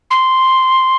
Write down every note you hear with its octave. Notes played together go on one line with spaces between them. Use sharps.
C6